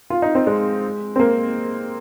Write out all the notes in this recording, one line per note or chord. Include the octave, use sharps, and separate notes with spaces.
F4
D#4
C4
G#3
C4
A#3